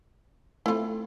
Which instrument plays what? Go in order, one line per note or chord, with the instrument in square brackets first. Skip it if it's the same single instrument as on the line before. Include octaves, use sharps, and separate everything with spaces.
[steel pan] A3 C4 [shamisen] E4 F4